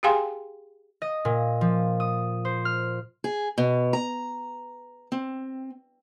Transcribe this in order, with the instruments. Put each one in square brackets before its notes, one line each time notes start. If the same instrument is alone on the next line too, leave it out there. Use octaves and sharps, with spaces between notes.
[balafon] G4 G#4 F5 G5 G#5 C6
[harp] D#5
A#2
F3
D#6
C5
F6
[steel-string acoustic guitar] G#4
B2
A#5
C4